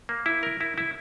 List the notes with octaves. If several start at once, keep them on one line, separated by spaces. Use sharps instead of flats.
A#3
E4
A#4
E4
E4